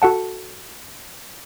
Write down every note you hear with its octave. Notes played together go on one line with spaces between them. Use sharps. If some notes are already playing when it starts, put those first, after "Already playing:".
F#4 A4 F#5 A5